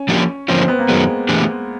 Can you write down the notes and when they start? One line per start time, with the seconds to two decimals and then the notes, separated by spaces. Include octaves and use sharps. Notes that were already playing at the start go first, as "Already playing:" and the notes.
Already playing: C#4
0.08 F3 A#3 D4 G4
0.48 D3 F3 A#3 C4 C#4 F4
0.59 C4
0.68 B3
0.79 A#3
0.89 F#2 D#3 F#3 G#3 B3
1.29 E3 A3 D4 G4